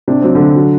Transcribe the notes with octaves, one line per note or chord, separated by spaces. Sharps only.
C3 D4
F#3 C4
D3 F#3 D4
F#3